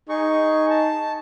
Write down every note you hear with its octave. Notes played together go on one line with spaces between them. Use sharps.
D#4 G#4 C#6
A5